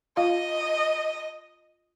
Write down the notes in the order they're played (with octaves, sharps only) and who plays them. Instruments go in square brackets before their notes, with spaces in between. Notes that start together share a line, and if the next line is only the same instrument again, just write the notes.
[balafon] F4 F5 [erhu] D#5